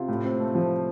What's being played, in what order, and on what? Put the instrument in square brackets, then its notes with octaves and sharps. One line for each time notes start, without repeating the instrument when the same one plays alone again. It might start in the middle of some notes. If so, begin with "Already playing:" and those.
Already playing: [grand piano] C3 F4
A2
C4
A3
F3